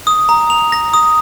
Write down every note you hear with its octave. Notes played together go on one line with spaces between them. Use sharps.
D#6
A#5
F7
A#6
D#6